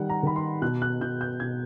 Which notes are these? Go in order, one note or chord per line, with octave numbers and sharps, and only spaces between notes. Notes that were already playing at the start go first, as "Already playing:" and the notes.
Already playing: D#3 G3 F#5
A#5
D#3 B5
C6
B2 F#6
F#6
B2 G6
G6
B2 G#6